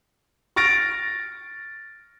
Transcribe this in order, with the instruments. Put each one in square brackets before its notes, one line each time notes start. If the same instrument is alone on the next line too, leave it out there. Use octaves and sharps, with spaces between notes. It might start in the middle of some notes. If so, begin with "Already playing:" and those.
[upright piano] C#6 F6 A6 A#6 D7